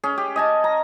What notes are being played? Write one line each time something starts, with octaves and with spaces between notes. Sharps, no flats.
C#4 G#4
G4
D#5 G#5 A5
A#5